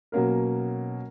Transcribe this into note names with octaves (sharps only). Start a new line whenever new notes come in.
B2 F#3 A#3 C#4 A#4